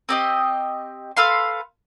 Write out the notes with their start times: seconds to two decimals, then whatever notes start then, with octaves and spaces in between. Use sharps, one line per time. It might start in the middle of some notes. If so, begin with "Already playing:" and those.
0.09 C4 G4 D#5
1.17 A4 B4 F5 C6